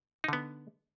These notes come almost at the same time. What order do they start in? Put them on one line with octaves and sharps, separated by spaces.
D#4 D3 B3